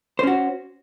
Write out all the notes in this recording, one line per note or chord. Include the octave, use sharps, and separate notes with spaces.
C#4 F#4 C5